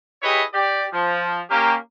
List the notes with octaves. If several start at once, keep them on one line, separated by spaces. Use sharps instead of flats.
E4 G4 G#4 B4 C#5 D#5
G4 D5
F3
A#3 C#4 G4